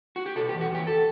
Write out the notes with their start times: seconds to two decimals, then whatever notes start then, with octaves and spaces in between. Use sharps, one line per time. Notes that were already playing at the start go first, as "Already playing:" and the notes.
0.16 F#4
0.26 G4
0.36 B2 A4
0.49 G4
0.54 E2
0.61 F#4
0.70 E2 G4
0.87 A4